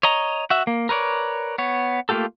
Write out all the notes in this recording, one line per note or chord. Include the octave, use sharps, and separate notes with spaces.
C#5 D#5 A#5
F#4 E5
A#3
A#4 B4 C#5 D5
B3 C#5
A3 A#3 F4 G4 A4